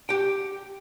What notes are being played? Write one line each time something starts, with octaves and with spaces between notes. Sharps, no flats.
G4 F#5 G5